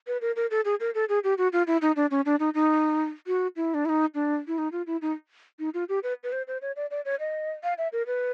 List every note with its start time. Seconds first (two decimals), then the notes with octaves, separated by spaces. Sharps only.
0.07 B4
0.21 A#4
0.36 A#4
0.51 A4
0.65 G#4
0.80 A#4
0.95 A4
1.09 G#4
1.24 G4
1.38 F#4
1.53 F4
1.67 E4
1.82 D#4
1.96 D4
2.11 C#4
2.26 D4
2.40 D#4
2.54 D#4
3.27 F#4
3.56 E4
3.74 D4
3.85 E4
3.89 D#4
4.15 D4
4.47 E4
4.58 D#4
4.72 F4
4.87 E4
5.02 D#4
5.59 D#4
5.74 F4
5.89 G4
6.03 B4
6.24 B4
6.32 C5
6.47 C5
6.62 C#5
6.76 D5
6.91 D5
7.05 C#5
7.20 D#5
7.64 F5
7.78 E5
7.93 A#4
8.07 B4